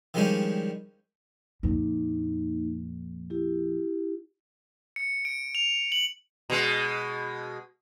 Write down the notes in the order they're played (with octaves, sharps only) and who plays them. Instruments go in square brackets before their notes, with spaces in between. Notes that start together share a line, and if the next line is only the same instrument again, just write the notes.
[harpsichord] D#3 F3 G3 G#3 C#4 D4
[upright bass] F2 A#2 [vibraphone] A#3 D#4
[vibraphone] E4 G4
[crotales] C#7
D7
F7
F#7
[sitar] B2 G#3